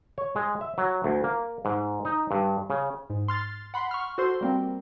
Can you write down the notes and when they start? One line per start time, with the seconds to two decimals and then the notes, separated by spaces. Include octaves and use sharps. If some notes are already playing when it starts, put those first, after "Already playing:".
0.18 C#5
0.36 G#3
0.61 E5
0.78 F#3
1.04 D2
1.24 A#3
1.65 G#2
2.05 D#4
2.31 G2
2.70 C#3
3.10 G#2
3.28 C6 F6 A6
3.74 F#5 B5 C6
3.91 C#6 F6
4.18 F#4 A4 C5 C6
4.41 G3 A#3 C4